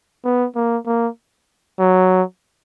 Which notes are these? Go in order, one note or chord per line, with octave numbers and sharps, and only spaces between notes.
B3
A#3
A#3
F#3